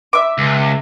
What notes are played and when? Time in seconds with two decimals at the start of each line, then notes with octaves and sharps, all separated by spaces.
0.13 E5 D6
0.38 C#2